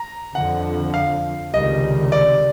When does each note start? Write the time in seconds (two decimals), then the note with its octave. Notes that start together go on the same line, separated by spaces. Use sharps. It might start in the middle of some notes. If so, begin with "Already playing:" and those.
Already playing: A#5
0.35 F2 D3 F3 F#5
0.94 F5
1.53 C#2 C3 D#3 G3 D#5
2.12 D5